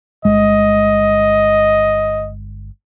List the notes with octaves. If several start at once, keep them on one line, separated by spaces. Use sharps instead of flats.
G1 G#3 D#5